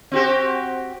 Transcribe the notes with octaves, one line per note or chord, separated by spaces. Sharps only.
C4 F#4 G4